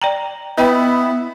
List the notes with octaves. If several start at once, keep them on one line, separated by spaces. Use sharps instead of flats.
D5 G5 A#5
B3 E4 B4 D#5 G5